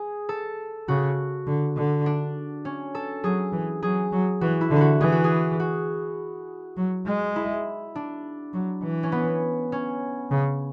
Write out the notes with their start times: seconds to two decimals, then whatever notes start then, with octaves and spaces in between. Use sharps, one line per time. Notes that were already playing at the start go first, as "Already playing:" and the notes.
Already playing: G#4
0.29 A4
0.88 C#3 F#4
1.47 D3
1.77 D3
2.06 D4
2.65 C#4
2.95 A4
3.24 F#3 G#4
3.53 E3
3.83 F#3 G#4
4.12 F#3
4.41 E3 F#4
4.61 E4
4.71 D3
4.76 E4 F#4
5.01 E3 G#4
5.12 F#4
5.24 G#4
5.60 F#4
6.77 F#3
7.06 G#3
7.36 E4
7.95 D4
8.54 F#3
8.84 E3
9.03 C#4
9.12 B3
9.72 C#4
10.31 C#3